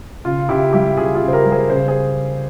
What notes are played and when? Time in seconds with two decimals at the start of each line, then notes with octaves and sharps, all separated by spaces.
0.25 C#3 F4
0.49 C#3 E4 G4
0.73 G3 E4 G4
0.97 C#3 F4 G#4
1.15 F4 G#4
1.22 C#3
1.28 C5
1.33 G4 A#4
1.46 G3
1.51 G#4 C5
1.70 C#3 G#4 C5
1.88 G#4 C5